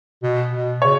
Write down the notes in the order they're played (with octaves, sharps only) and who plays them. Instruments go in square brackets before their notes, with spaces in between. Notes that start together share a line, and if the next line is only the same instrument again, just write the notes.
[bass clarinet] B2
B2
[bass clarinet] C#3 [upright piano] C#5